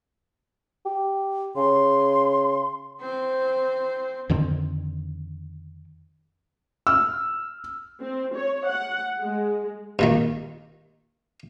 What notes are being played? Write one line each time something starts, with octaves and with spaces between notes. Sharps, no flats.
G4
C#3 C6
C4 C5
F2 D3 D#3 C4
E6 F6
C4
C#5
F#5
G#3
G2 A#2 D#3